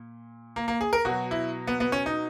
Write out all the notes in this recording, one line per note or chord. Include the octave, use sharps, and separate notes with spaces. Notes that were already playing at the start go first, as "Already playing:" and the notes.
Already playing: A#2
A#3
A#3
G#4
A#4
B2 F#3 F#4
E4
B3
B3
C#4
D#4